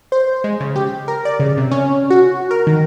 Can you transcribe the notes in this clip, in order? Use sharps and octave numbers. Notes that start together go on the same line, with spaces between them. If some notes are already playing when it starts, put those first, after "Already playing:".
C5
G#3
C#3
G4
A#4
D5
C#3
C3
C#4
F#4
A#4
D#3